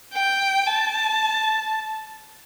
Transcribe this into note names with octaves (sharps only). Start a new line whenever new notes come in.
G5
A5